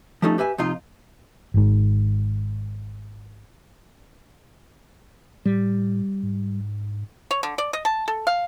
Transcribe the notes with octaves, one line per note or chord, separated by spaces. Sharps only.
F3 G3 A3 C#4 D#4
G4 B4 E5 G#5
F2 C3 D#4 F4
G#1 G#2
A2 G3
G#2
C#5
D3
D5
D#5
A5
A4
F5